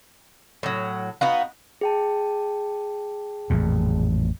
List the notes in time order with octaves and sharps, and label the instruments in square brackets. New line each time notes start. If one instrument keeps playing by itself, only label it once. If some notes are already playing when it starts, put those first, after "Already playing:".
[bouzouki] A2 F#3
[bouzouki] B3 D#4 F#4 [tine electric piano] F5
[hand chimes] G#4 G5 A5
[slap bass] A1 F2 A#2